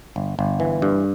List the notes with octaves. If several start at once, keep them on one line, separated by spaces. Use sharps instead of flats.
G1
G1
E3
G2